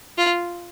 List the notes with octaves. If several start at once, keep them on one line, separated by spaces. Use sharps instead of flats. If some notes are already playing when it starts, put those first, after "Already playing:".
F4